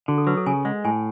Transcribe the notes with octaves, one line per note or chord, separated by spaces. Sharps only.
D3 F#4
A4
F#3 B4
A4
C#3 G#5
G#3 F#5
A2 G#5